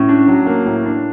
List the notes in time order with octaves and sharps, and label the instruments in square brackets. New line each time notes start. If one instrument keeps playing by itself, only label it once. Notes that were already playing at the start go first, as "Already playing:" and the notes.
Already playing: [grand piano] A2 [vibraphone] C#4
[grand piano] D4
F#3
A#3
A2
D4